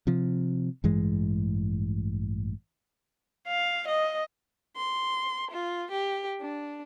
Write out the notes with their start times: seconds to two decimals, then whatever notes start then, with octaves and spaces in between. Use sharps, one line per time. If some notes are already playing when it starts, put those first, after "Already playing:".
0.07 C3 F3
0.84 A1 G2 E3 G#3
3.48 F5
3.88 D#5
4.77 C6
5.52 F4
5.91 G4
6.40 D4